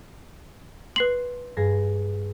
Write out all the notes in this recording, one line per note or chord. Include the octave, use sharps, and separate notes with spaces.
B4 C6 C7 F#7
G2 G#4 A#6